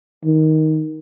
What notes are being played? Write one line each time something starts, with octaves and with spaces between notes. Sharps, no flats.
D#3